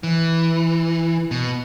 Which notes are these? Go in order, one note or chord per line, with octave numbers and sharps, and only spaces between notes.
E3
B2